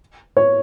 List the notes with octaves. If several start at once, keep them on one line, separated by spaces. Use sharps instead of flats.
C#5